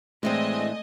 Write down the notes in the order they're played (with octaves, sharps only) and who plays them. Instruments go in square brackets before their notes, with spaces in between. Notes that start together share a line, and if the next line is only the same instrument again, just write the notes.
[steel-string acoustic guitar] A2 E3 D4 [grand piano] G#3 C4 [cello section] A3 [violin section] D#5 G#5